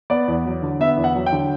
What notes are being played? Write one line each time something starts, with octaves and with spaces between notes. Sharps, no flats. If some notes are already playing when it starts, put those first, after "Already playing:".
B3 D5
E2
F#3
D3
B3 E5
E2
F#5
F#3
G5
D3